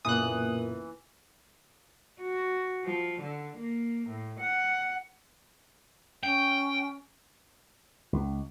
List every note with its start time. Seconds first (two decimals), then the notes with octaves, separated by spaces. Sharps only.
0.05 F#1 B1 A#2 E3 D#6 F#6
2.21 F#4
2.85 F3
3.22 D3
3.57 A#3
4.08 A2
4.39 F#5
6.23 C#4 G5
8.13 C#2